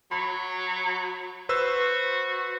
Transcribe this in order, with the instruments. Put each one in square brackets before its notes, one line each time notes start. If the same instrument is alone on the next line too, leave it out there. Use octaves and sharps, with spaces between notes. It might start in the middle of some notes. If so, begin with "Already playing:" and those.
[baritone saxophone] F#3 [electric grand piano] B5
[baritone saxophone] F#4 [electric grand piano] B4 C5 E6